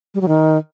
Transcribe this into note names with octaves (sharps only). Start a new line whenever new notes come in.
G3
F#3
D#3